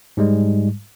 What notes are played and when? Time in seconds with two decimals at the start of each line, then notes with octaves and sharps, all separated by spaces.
0.17 G#2 G3 G#3